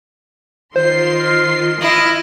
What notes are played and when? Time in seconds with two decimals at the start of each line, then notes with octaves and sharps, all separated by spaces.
0.76 D#3 F4 C5 C6 C7
1.20 F6
1.81 E4 D#5